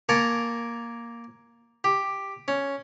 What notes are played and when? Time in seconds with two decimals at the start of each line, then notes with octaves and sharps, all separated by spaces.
0.09 A#3 A#4 G#5 A5 C#6
1.84 G4
2.48 C#4